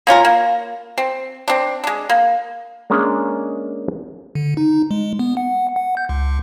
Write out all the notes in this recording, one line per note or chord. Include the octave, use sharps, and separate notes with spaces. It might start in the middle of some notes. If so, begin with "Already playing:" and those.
A#3 C#4 F4 A#4
A#3
C4
C4 D4
G#3 D4
A#3
G#3 A#3 C#4 D4 G#4
D3
D#4
G#3
B3
F#5
F#5
G6
C#2